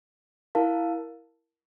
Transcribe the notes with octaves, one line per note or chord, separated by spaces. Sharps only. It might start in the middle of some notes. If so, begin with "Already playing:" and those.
E4 A#4 F5 A5